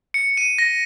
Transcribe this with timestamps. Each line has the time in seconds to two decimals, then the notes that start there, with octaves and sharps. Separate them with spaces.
0.14 C#7
0.37 D#7
0.58 A#6